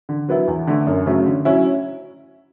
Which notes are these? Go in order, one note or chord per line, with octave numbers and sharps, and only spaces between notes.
D3
F#3 B3 E4
E2
D3 A3
F#2
C#3 F#3 A3 C#4
D3
F#3 C#4 E4